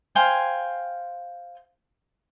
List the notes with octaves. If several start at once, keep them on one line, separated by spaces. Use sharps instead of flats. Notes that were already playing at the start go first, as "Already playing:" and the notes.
C5 F5 G5 G#5